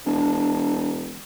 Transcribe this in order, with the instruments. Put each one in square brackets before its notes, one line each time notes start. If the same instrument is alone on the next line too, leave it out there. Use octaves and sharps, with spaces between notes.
[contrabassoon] E1 [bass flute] D4